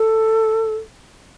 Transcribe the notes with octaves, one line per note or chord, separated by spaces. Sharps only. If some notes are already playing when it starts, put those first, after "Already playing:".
Already playing: A4